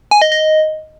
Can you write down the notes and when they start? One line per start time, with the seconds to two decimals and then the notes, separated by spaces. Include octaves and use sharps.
0.11 G#5
0.22 D#5
0.32 D#5